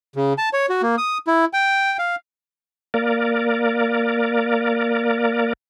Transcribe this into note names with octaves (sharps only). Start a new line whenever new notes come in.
C#3
A5
C#5
F#4
A#3
D#6
E4
G5
F5
A#3 A#4 D5